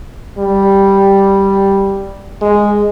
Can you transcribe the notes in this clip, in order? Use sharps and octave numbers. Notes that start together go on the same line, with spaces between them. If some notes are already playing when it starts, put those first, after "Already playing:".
G3
G#3